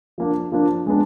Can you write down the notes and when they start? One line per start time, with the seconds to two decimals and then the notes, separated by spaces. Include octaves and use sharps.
0.18 F3 A#3 D4
0.52 F3 A#3 D4
0.86 G#3 B3 D4